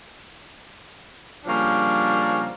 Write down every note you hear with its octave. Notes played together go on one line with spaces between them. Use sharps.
C#3 F3 G3 A#3 C#4 D4